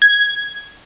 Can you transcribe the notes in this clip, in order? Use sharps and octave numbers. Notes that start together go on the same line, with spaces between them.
G#6